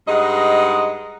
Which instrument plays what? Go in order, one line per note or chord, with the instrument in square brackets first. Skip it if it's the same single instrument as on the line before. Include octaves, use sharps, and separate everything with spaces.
[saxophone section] G2 G#3 D#4 D#5 F#5